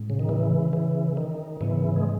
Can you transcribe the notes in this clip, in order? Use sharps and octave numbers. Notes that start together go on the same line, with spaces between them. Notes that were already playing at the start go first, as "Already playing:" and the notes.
Already playing: A2 G#3 C#4
C#3
D#3
C#3 E3
C#3 E3
D#3
G#2 C#3 E3 F#3 B3
G#3